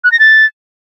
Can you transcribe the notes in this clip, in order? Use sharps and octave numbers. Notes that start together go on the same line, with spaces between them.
F#6
A#6
A6